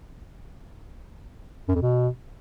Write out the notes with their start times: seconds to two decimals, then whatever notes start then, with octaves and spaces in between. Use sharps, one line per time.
1.69 F#2
1.75 F2
1.82 B2